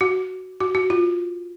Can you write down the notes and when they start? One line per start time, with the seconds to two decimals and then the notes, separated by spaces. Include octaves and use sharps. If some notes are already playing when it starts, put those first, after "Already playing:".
0.01 F#4
0.60 F#4
0.75 F#4
0.90 F4